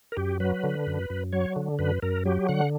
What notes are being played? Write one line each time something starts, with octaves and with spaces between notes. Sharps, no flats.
A#4
F#2 G4
F#3 B4
D3
F#2
F#2
F#3 C#5
D3
F#2 B4
F#2 A#4
F#3 G4
D3 F#5